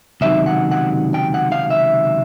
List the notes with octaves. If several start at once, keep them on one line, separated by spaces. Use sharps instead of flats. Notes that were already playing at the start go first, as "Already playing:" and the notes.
C#2 C3 D#3 F#3 E5
F#5
F#5
G5
F#5
F5
E5